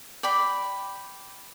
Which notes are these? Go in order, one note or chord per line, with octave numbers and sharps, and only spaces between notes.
D5 G5 B5